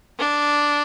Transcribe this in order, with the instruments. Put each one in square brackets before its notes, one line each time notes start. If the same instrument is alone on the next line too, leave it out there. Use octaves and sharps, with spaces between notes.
[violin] D4